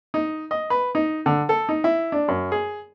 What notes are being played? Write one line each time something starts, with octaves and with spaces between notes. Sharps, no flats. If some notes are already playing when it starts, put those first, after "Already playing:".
D#4
D#5
B4
D#4
D3
A4
D#4
E4
D4
F#2
G#4